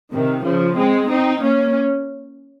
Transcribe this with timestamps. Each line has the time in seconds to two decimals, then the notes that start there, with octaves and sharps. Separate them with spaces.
0.12 C3 D#3
0.44 C#3 F3
0.77 G#3 C4
1.09 C4 D#4
1.42 A#3 C#4